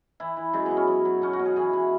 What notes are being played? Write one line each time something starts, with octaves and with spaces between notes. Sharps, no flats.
E3 E4
E3
F#2 G#3
F#2 B3
C#4
F#3
F#3
B2 C#4
F#4
B2
G#4
E3 G#4
E3